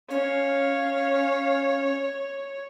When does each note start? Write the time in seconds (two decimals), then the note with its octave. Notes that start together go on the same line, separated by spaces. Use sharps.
0.10 C#4 C#5 F5